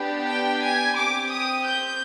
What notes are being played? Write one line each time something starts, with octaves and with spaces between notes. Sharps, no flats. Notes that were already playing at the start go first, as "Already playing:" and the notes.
Already playing: B3 D4 G4
G5
G#5
C4 G4 D6
D#6
G6